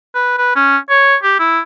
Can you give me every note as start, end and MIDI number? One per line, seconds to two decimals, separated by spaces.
0.15 0.33 71
0.38 0.55 71
0.56 0.77 61
0.90 1.16 73
1.23 1.34 67
1.40 1.60 64